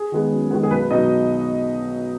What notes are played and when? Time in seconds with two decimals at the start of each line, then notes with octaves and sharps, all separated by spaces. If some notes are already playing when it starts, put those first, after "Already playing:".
Already playing: G#4
0.12 D#3 G#3 B3
0.32 F#2
0.50 D#3 G#3 B3
0.63 G#4
0.71 B1 B4
0.91 B2 F#3 B3 D#4 D#5